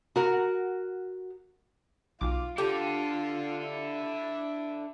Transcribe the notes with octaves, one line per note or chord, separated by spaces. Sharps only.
F#4 A#4 F#5
B1 F4 D6
D3 D4 F4 G4 A4
E4